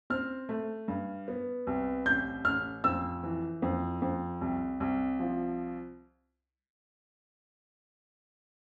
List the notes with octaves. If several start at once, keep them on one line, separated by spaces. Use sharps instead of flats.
C4 F6
A3
G2
B3
C2
A1 G6
A1 F6
F2 E6
E3
F2
F2
C2
C2
F3